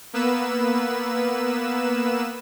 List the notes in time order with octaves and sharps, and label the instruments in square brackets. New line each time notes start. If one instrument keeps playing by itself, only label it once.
[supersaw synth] A#3 B3 B4 E6 E7